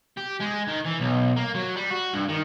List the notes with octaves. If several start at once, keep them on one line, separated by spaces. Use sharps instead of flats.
G4
G#3
D#3
E3
B1
A#3
F#3
G3
F#4
G2
D#3